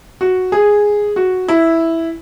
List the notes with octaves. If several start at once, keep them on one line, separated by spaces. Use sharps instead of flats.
F#4
G#4
F#4
E4